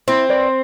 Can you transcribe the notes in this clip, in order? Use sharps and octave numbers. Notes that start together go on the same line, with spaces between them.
C4 E4
B4 D5